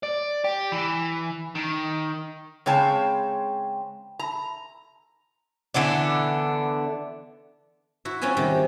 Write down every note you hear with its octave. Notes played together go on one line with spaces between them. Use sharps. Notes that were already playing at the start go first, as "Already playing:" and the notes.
D5
G4
E3
D#3
C#3 G#3 C4 C#5 G5 A5
A#5
D3 E3 B3 D4
E4 F#4
C4 C#4 F4 F#4 G#5
C3 D#3 G3